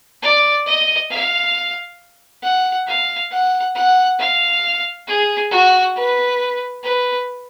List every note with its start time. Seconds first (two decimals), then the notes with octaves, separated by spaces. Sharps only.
0.22 D5
0.66 D#5
1.11 F5
2.43 F#5
2.87 F5
3.31 F#5
3.75 F#5
4.19 F5
5.07 G#4
5.51 F#4
5.95 B4
6.83 B4